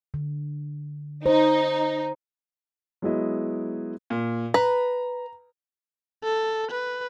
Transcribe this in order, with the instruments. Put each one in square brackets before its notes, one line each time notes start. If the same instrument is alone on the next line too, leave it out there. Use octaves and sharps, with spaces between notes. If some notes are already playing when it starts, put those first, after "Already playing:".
[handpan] D3
[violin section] D#4 [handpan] C5
[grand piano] F#3 G#3 B3 E4 D#5
[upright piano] A#2
[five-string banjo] B4 [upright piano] A#5
[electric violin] A4
B4